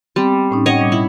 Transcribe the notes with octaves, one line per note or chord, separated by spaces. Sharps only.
G3 B3 C4
A2 C#4 D#4
C#5 D#5 F#5 G5
B2 G3 D6
E4